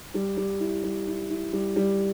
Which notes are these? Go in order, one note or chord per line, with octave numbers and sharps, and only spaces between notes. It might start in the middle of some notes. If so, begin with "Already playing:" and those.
G3
G3
E4
G3
E4
E4
G3
G3